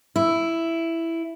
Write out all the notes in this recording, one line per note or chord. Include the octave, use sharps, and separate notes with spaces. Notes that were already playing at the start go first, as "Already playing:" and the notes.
E4